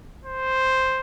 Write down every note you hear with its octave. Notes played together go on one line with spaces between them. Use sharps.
C5